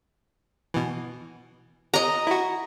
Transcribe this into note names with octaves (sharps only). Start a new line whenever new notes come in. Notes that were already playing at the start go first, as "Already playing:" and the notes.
B2 E3
D#5 A#5
E4 F#4